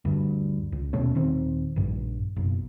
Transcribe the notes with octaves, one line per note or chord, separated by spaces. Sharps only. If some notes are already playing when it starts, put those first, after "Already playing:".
D2 G2
C#2
D#2 B2 A3 C#4
D#1 D#3 C4
A#1 G2
F#1 B1